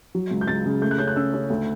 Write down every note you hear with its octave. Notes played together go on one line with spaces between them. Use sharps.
F#3
C#2
G6
C#2 A6
C#3
A3 G6
F#6
C#4 G6
F#6
C#4 E6
C#4
D2